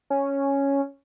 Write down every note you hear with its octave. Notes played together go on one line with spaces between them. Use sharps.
C#4